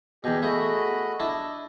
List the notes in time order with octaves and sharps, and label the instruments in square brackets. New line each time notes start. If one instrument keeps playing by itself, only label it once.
[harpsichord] E2 B2 [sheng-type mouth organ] G4 G#4 D#5
[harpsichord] A3 G#4 [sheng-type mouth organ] F#4 D#5 B5
[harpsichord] D4 E4 A5 [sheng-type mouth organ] D#5